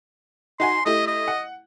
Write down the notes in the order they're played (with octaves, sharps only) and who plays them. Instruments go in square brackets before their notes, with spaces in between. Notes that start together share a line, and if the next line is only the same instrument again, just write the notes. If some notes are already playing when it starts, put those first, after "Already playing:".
[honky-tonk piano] D#4 F#4 G#5 [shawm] C6
[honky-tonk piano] A3 E4 G4 [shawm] D#5
[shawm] D#5
[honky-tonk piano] F#5